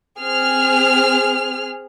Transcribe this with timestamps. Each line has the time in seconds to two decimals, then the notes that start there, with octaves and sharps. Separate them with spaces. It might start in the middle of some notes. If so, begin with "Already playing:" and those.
0.20 C4 G#4 F6